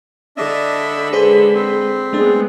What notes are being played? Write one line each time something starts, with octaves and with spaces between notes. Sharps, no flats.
D3 D4 D#5 E5 B5
G#3 G#4 B4 C5
C4
G#3 A3 B3 D4